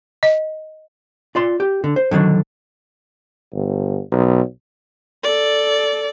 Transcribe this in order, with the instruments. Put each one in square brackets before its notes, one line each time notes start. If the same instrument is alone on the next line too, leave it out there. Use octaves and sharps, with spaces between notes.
[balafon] D#5
[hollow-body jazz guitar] F4 D5 C6
G4
D3
C5
D3 D#3 F#3 D4
[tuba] G1
B1
[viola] A4 D5